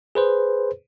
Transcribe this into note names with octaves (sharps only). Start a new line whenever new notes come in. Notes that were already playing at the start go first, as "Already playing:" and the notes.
G#4 B4 C5